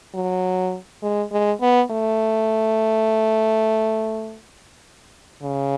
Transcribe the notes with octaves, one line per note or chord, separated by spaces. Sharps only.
F#3
G#3
G#3
B3
A3
C#3